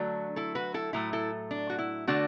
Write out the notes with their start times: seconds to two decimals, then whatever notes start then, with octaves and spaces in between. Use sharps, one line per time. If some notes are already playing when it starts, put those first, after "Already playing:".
Already playing: D3 F#3 A3 D4 F#4
0.36 E4 A4
0.55 F#4 B4
0.74 E4 A4
0.93 A2 F#3 A3 E4
1.13 E4 A4
1.51 D4
1.70 F#4
1.78 E4
2.07 D3 A3 D4 F#4